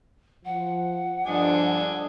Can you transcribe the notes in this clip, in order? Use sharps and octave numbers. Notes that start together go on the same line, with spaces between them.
F3 F#5
G2 D3 F3 D4 D#5 G#5